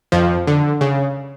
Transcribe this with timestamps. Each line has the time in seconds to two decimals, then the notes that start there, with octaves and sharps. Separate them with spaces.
0.12 F2 F3
0.47 D3
0.81 C#3